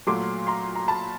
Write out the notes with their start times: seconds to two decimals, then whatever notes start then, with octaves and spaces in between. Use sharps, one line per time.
0.07 A#2 F#3 A3 C6 D6
0.47 A#5 C6
0.75 A#5
0.88 A5 B5